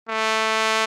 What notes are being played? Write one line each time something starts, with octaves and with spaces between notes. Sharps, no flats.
A3